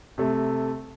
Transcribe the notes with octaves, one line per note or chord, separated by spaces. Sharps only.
C3 A3